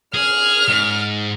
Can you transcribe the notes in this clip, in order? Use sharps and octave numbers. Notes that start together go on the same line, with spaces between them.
G#4 F6
G#2